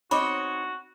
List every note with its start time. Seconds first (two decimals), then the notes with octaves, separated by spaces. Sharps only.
0.11 C4 D#4 F#4 C#5 B5 D6